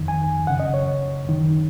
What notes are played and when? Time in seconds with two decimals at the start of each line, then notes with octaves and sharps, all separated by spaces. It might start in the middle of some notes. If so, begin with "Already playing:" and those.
Already playing: F2 D#3
0.08 G#5
0.47 F#2 C#3 F#5
0.60 D#5
0.74 C#5
1.25 F#2 D#3